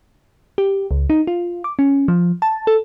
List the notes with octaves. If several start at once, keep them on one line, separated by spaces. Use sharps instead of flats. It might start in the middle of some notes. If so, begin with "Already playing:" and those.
G4
C#2
D#4
F4
D6
C#4
F3
A5
A4